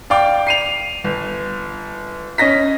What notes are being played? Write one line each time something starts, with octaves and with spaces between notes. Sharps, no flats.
D5 F5 G5 D6
C7 D#7 F7
G1
C#4 D#5 A#6 B6